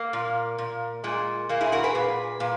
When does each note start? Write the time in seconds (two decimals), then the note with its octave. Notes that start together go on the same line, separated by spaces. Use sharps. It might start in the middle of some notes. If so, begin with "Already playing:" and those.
Already playing: A#3
0.13 A#2
0.58 A#2
1.04 A#2 G#3
1.49 A#2 A#3
1.61 E4 G#4
1.72 F#4 A#4
1.84 G#4 B4
1.95 A#2
2.40 A#2